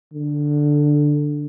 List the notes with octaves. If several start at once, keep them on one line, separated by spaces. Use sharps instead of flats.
D3